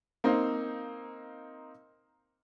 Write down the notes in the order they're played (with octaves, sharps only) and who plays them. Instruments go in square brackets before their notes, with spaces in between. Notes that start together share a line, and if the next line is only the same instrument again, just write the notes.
[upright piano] A#3 C4 D#4 C5 F5